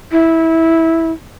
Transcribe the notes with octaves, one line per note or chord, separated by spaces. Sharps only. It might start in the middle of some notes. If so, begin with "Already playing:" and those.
E4